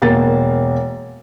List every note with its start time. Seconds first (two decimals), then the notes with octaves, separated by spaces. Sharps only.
0.02 E1 A#3 A6